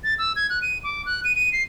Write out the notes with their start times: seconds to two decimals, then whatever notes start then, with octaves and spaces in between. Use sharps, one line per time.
0.04 A6
0.19 E6
0.36 G#6
0.50 F#6
0.62 D#7
0.84 D6
1.06 F#6
1.24 D#7
1.36 D#7
1.53 C7